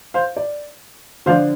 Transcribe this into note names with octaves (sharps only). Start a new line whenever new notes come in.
C5 F5
D5
D3 F3 D4 C5 F5